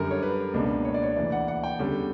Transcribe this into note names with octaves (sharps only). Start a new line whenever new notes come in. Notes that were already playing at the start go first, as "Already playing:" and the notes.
Already playing: F#2 D3 G3 A#4
C#5
B4
C#2 B2 A#3 D4
C#5
D5
C#5
D2 C#3 E3 A#3 D5
F#5
F#5
G5
E2 D3 G3 C#4